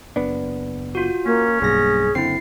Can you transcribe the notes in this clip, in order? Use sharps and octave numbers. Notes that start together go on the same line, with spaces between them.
F#1 B3 D4
F4 F#4
A#3 C#4
B1 G2 A#3 G#4 A#6
F#1 D3 C4 E4 C7